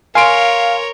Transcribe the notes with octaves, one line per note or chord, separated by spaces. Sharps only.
A#4 C#5 F5 G#5 C6 D7